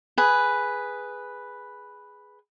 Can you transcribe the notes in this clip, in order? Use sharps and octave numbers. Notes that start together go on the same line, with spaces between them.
G#4 B4